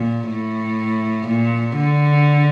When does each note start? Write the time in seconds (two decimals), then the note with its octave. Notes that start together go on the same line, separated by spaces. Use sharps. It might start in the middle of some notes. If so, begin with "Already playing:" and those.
Already playing: A#2
0.29 A2
1.28 A#2
1.78 D3